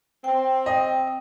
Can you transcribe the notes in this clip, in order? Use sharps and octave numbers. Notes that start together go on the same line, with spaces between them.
C4 G5
D#5